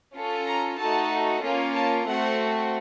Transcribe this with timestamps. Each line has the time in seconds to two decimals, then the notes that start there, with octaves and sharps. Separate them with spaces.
0.15 C#4 F4 A4
0.47 A#5
0.79 A3 D#4 F#4 A4 A5
1.43 A#3 C#4 F4
1.75 A5
2.07 A3 C4 F#4 F#5